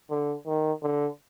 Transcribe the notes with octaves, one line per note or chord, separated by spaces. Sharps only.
D3
D#3
D3